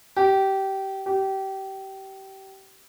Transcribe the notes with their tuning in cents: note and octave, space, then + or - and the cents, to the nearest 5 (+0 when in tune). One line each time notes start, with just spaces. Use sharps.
G4 -20
G4 -25